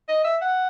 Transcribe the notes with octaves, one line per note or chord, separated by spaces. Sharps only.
D#5
E5
F#5